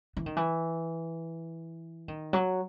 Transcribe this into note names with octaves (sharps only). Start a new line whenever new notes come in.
E3
D#3
E3
D#3
F#3